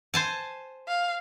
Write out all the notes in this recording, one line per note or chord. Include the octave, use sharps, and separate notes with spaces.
C5 G#5 A5
F5